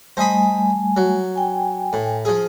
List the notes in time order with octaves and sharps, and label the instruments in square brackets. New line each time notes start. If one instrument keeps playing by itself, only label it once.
[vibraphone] G3 A3 G#5 [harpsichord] C5 D#5 B5
[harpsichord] F#3
[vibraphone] G5 G#5
[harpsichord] A2
F3 G#4